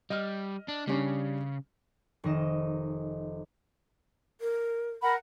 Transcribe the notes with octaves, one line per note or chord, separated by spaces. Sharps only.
G3 D#5 F6
D4
C#3 G3 C#4 D4
F1 D#3 D#5 E7
A#4
A#4 F#5 B5